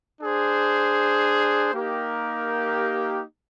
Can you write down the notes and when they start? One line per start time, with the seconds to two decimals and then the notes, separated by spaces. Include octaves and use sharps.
0.22 D4 G#4 C5
1.72 A#3 D#4 G4 A#4